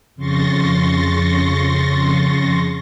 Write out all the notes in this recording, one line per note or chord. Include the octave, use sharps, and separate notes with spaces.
F2 C#3 C6 C#6 A6 A#6